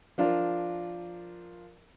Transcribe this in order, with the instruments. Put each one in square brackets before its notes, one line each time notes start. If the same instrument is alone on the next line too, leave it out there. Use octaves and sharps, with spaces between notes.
[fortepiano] F3 D4 F4 A#4